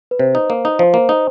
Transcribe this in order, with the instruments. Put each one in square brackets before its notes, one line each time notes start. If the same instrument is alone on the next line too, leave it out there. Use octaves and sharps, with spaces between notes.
[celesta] B4
[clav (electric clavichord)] C3 [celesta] C5
[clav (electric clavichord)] D#4
A#3
D#4
[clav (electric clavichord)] F3 [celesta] C5
[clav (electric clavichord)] A#3
D#4